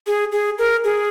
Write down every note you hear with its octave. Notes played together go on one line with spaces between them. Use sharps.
G#4
G#4
A#4
G#4